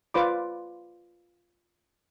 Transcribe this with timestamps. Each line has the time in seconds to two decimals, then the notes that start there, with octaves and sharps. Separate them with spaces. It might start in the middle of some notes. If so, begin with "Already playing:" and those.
0.14 F4 B4 C5 D5 B5 D6